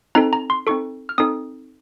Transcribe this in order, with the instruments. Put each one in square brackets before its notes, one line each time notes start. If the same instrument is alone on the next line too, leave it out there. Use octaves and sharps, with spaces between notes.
[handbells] C4 D#4 A4 A#5
A#5
C6
C4 D#4 A4 C#6
F6
C4 D#4 A4 D#6